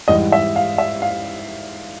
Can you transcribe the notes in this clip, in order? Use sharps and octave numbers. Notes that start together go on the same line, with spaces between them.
G#2 E3 G3 D#5
E5
F5
E5
F5